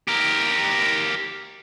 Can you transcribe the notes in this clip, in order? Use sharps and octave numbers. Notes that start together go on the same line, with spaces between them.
G4 A#4